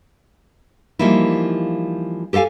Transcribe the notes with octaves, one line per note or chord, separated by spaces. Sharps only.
E3 F3 G3 A#3 D#4 E4
G4 A4 D#5 F5 G#5